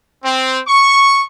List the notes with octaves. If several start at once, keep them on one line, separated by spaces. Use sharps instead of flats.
C4
C#6